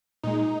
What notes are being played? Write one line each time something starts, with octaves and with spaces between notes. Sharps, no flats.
A#2 G#3 D#4